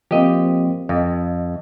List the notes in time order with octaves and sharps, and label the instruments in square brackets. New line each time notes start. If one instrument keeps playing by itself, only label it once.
[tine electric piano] F3 A#3 C4 [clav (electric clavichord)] G4 D#5
[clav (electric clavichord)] F2 [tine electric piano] D#5